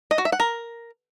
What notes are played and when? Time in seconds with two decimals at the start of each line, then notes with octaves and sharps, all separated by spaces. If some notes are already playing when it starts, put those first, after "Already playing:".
0.11 D#5
0.18 F#4
0.25 E5
0.32 F#5
0.40 A#4